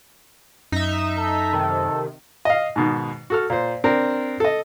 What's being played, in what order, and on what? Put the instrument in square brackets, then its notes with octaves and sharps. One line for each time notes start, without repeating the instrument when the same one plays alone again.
[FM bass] F#2 [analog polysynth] D#4 E5
[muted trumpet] A4
[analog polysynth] C3 D#3
[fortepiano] D#5 F5
G#2 B2 D#3
F#4 A4 F6
A#2 C5
C4 D4 A#4
A4 D#5